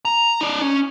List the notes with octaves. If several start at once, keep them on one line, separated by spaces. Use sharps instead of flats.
A#5
D#4 D5
C#4